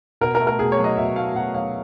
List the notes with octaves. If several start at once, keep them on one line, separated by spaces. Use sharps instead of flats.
B2 A#4
A#4
A3
A#4
B2 G#4
C#5
F#3
D#5
B2 E5
A3 F5
B2 F#5
F#3 F5